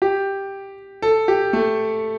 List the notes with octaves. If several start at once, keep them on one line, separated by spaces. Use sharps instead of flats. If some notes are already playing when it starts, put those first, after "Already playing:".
G4
A4
G4
A3